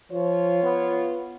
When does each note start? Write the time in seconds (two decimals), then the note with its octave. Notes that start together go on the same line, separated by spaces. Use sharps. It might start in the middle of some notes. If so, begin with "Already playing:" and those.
0.12 F3 F4 C#5
0.63 B3